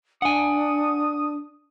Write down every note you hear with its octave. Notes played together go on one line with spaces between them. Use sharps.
D4 F#5 G#5 D#6